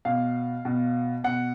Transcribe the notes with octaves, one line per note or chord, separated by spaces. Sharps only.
B2 F5
B2
B2 F#5